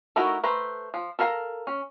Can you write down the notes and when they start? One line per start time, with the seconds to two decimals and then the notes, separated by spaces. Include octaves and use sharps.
0.16 A3 D#4 E4 F#4 A#4
0.43 A3 B4 C5 A#5
0.94 F3
1.19 A4 A#4 F5 G#5 A#5
1.67 C#4